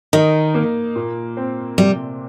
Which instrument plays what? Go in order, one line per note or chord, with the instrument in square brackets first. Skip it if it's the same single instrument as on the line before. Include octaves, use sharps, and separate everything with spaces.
[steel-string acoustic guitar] D#3 [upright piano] D#4
[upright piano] A#3
A#2
C4
[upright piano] C3 [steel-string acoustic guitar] G3